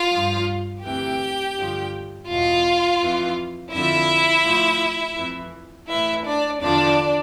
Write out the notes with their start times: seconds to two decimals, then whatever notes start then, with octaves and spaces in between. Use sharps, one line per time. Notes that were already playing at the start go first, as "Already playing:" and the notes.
Already playing: F4 F5
0.11 G2 F3
0.83 D2 C3 E3 G4 G5
1.57 G2 D3 F3
2.28 E2 B2 F4 F5
3.01 F2 E3
3.72 F2 D3 F3 E4 E5
4.44 A2 F3
5.17 F2 E3
5.88 A2 E3 E4 E5
6.25 D4 D5
6.61 E2 D3 F3 D4 D5